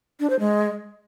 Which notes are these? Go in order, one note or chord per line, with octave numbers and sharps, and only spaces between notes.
D4
C5
G#3